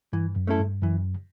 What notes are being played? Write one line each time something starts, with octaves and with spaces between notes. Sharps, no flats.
G2 E3
F#2
A3 C#4 E4 A4
G2
F#2 E3